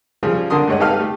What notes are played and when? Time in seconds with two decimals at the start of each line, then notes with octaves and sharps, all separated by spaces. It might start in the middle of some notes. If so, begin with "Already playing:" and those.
0.23 C#3 F3 G3 F4 G#4
0.50 D3 D4 A#4 C6 D#6
0.68 G2 G#3 C#5 D#5 F#5
0.80 D#4 G4 A4 B4 F5 F6
0.99 A3 G4